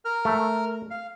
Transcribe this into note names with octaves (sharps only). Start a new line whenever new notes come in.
A#4 F6
A3
F5